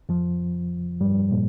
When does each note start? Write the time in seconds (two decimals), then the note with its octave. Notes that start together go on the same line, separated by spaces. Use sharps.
0.09 F2 F3
1.01 G2 G3
1.31 A#2 A#3